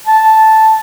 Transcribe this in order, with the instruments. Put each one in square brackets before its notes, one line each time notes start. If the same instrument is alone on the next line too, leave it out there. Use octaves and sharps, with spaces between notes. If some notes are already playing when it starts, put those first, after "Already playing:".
[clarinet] A5